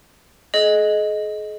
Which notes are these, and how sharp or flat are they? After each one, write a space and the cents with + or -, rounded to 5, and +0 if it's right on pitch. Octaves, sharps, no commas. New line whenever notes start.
G#4 +40 D#5 +0